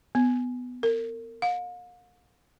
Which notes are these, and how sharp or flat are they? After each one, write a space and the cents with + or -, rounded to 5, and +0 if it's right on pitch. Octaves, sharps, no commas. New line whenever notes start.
B3 +10
A#4 -35
F5 +45